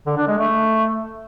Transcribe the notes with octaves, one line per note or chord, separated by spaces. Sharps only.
D3
D4
G#3
A3